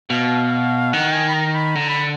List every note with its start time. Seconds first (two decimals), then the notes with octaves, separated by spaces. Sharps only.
0.10 B2 F5
0.93 D#3 F#5
1.13 G#5
1.29 B5
1.34 A#5
1.55 B5
1.75 D3 A#5
1.89 B5